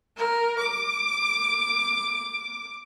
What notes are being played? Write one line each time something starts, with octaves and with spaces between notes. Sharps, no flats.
A#4
D6